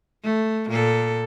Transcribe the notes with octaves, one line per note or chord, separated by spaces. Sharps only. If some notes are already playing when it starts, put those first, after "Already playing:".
A3
A#2 A4